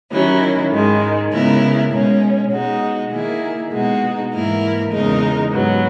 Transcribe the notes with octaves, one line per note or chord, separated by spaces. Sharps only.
D#3 F#3 C#4 E4
G#2 D#3 G#3
C#3 G#3 B3 E4 A#4
B2 G#3 C#4
B2 G#3 D#4 F#4
D#3 A#3 E4 G#4
B2 G#3 D#4 F#4
G#2 E3 A#3 E4 A#4
E2 C#3 G#3 D#4 A#4
G#2 F#3 B3